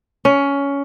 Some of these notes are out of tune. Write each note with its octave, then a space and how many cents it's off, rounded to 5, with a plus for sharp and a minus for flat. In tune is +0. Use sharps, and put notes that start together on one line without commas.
C#4 +15